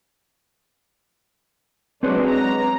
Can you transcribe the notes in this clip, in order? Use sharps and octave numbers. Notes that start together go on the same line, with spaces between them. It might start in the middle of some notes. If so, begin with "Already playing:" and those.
F#3 G#3 C4 D4 B4 C#5
A#5